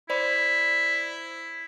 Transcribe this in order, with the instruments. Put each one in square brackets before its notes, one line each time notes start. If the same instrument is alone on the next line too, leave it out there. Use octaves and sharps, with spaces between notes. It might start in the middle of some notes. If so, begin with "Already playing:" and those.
[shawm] E4 [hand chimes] C5 D5 B5